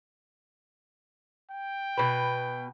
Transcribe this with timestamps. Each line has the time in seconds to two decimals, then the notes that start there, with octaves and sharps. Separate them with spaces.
1.52 G5
1.98 B2 B4